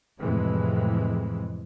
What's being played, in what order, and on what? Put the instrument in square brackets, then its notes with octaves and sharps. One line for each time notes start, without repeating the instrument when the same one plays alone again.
[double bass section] F2 A2 C3 E3 G#3